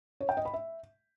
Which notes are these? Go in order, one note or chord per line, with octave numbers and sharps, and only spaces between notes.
C#5
G5
D#5
B5
E5